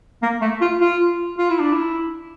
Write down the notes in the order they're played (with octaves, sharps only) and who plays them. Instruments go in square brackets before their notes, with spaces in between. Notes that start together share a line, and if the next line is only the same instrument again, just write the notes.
[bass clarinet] A#3
A3
F4
F4
F4
E4
D4
E4